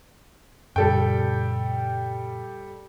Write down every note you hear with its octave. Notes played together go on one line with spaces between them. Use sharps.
F#2 A#2 C#3 G3 A4 G5